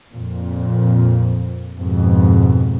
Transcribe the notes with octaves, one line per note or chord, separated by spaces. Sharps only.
F2 A#2
F2 G#2 B2